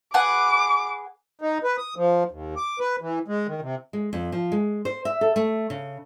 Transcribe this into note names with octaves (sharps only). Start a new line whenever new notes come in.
G#4 B4 F#5 D6
D#4
B4
D#6
F3
D#2
D6
B4
E3
G#3
D#3
C3
G#3
F2
F3
G#3
C5
E5
A4
A3
C#3